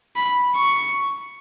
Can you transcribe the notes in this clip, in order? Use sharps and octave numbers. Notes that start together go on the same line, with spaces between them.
B5
C#6